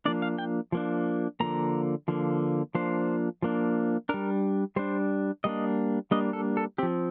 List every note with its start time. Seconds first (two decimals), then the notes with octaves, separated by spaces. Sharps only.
0.05 F3 A#3 D4 D5
0.22 F5
0.38 G5
0.72 F3 A#3 D4
1.40 D3 F3 A#3 A#5
2.08 D3 F3 A#3
2.75 F3 A#3 D4 C5
3.42 F3 A#3 D4
4.09 G3 D4 A#4
4.76 G3 D4 C5
5.44 G3 A#3 D4 D#5
6.11 G3 A#3 D4 D#5
6.33 A4
6.57 A4
6.78 F3 C4 G4